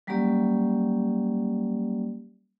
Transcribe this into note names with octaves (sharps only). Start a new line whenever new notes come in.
F#3 G3 A#3 C#4 G4 D5